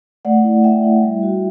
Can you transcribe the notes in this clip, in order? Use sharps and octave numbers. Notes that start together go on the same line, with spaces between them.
A3 D5 F#5
E4
E4 E5 G5
E4
G3
F#4